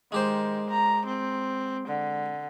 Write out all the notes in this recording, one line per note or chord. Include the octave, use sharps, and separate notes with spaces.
D#3 G#3 G4 C5
A#5
C4
D3